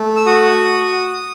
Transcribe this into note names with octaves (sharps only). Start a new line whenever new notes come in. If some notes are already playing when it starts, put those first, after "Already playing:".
Already playing: A3
E6
F#4 D#6